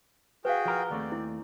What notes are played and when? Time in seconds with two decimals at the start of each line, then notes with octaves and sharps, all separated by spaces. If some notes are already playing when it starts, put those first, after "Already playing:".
0.45 F#4 G#4 B4 F5 G5
0.66 F3 A#4
0.90 D#2 A3 C4 D5
1.12 E4